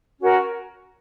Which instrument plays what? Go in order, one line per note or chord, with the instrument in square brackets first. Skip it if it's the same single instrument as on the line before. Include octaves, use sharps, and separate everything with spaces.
[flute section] C#4 F#4 A#4